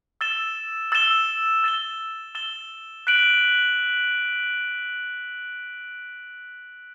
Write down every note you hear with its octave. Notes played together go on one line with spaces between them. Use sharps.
E6 A6 E7 G7
E6 A6 E7 G7
E6 A6 E7 G7
E6 A6 E7 G7
F#6 B6 D7 F#7